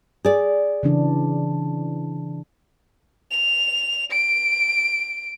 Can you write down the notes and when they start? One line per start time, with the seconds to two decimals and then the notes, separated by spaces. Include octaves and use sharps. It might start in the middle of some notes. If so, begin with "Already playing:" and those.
0.25 G#4 D5
0.83 C#3 E3 D4
3.31 F7
4.12 D7